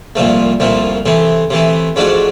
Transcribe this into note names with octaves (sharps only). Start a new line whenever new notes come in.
C2 A#2 F3 A3
C2 A#2 F3 A3
C3 E3 A3
C3 E3 A3
G#2 F3 A3 D4 F#4